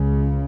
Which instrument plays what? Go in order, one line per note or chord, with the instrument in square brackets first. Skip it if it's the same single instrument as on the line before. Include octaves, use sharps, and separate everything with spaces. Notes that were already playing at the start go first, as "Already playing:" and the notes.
Already playing: [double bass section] C#2 C#3